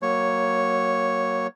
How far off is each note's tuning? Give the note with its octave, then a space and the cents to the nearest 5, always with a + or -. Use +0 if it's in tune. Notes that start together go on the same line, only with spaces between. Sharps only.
F#3 +15 A#3 +0 C#5 +0